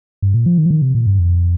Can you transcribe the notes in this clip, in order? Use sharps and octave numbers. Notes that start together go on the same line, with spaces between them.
G2
A#2
F3
D#3
F3
D#3
C3
A#2
G2
F2